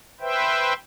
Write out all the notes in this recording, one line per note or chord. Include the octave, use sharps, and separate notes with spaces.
B4 C5 E5 G5